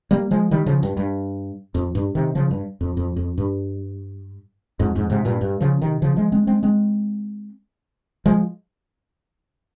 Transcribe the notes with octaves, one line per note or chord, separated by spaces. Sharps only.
G3 A#3
F3 G#3
D#3 G3
C#3 F3
G2
G2
F2
G2
C3 D#3
C#3 F3
G2
F2
F2
F2
G2
F2 G#2
F2 G#2
G#2 C3
G2 A#2
G2
C#3 F3
C3 D#3
C#3 F3
F3 G#3
G#3 C4
G#3 C4
G#3 C4
F3 G#3